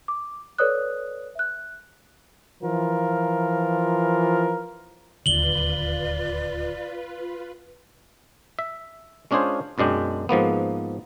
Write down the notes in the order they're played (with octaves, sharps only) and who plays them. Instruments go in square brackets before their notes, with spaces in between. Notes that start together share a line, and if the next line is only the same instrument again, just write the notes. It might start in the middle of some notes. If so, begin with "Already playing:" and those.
[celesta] D6
A4 B4 C#5 D5 D#6 F#6
E5 F#6
[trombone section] E3 F3 F4 A#4
[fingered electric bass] D1 D#2 D3 [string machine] F4 B4 [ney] D5 [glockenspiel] F#7 G7
[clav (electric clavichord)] E5
G#3 C#4 D4 F4 G#4 C5
B1 F#2 G#3 D4 G5
G#2 F3 A#3 B3